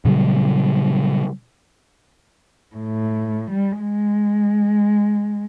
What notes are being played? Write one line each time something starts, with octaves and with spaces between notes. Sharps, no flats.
A#2 C#3 F#3 G3
A2
G3
G#3